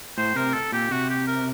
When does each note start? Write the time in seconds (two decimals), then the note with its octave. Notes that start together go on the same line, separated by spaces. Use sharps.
0.17 A2 C5
0.36 C3 A#4
0.54 A4
0.72 A#2 G4
0.91 C3 F#4
1.10 G4
1.27 A#4